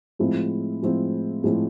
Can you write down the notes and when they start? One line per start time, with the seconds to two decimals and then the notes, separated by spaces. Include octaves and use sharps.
0.19 A2 F3 G#3 C4 E4
0.82 A2 F3 G#3 C4 E4
1.44 A2 F3 G#3 C4 E4